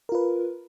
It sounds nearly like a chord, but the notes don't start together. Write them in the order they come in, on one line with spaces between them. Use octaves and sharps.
A#4 F4 B4